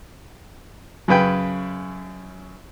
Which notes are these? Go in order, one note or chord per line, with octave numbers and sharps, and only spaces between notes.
F#2 C#3 B4 G5